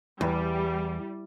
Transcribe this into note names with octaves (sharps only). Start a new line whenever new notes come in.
E2 G3